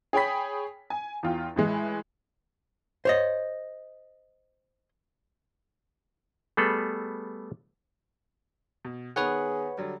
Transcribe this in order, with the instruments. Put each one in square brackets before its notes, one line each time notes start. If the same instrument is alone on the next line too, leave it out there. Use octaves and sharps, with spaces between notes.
[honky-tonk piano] G#4 C#5 G5 B5 B6
G#5
E2 F4 G5
A2 E3 G#3
[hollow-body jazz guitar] C5 C#5 D#5
[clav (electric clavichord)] G3 A3 B3 G#4 A4
[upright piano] B2
[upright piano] D#3 B3 [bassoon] G#4 [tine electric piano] B4 C#5 F#5
[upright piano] D3 F#3 G3